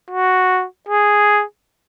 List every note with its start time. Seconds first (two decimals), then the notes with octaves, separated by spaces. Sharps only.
0.11 F#4
0.89 G#4